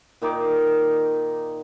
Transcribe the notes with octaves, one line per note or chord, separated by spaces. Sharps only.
A#2 D#3 D#4 D6